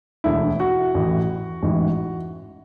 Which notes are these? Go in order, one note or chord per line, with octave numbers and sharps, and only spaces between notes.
E1 D2 D3 E4
F#4
A1 A2 E3
A1 G#2 E3